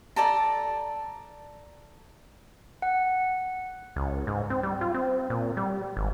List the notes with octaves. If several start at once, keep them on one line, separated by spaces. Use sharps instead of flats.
A4 D5 A5 A#5
F#5
C#2
G#2
C4
G3
F4
C4
A#2
G3
G#1